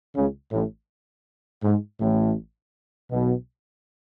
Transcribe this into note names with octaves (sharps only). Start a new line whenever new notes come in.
C#2 C#3
A1 A2
G#2
A1 A2
B1 B2